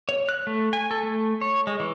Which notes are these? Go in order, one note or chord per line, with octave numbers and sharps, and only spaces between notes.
C#5
F#6
A3
G#5
A4
A3
C#5
G#3
E3